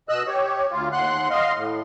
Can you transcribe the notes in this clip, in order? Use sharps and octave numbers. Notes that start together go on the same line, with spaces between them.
B2 D#5 E6 F#6
G4 C#5
D2 F4
D#2 F#5 C6 F#6
D#5 F5 C6
A2